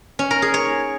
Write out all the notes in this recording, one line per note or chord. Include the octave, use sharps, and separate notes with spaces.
C#4
A#4
G#4
C#5